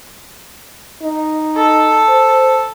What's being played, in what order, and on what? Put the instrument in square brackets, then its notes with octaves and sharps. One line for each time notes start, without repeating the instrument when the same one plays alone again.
[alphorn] D#4
[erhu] A4
[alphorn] C5